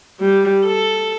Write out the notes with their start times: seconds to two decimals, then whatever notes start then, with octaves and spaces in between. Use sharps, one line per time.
0.20 G3
0.65 A4